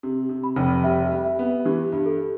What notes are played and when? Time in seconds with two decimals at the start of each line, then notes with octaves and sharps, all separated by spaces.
0.03 C3
0.29 C3
0.44 B5
0.56 F1
0.84 G3 E5
1.12 G3
1.25 E5
1.39 B3
1.65 E3 G4
1.92 G2
2.06 A4